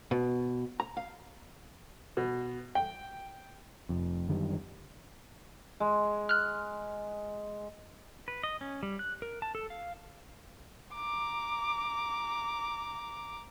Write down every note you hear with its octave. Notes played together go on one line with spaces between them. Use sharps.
B2
A#5
F5
B2
G5
F1 F2
F#2 D3 D#3 G3
G#3
F6 F#6
B4
D#5
C#4
G3
F#6
A#4
A5
A4
F5
A#5 D6